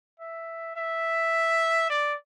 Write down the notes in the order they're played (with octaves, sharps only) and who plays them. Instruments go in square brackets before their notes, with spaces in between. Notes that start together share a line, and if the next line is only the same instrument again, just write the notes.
[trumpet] E5
E5
D5